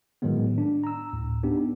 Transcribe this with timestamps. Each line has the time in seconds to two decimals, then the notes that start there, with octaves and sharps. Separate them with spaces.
0.22 A2 D#3 F#3 G#3 B3
0.58 D4
0.84 A#5 E6
1.13 D2 A2
1.43 B3 D4 D#4 G4